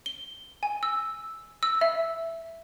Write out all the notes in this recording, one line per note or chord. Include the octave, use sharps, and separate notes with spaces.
G7
G#5
E6
E6
E5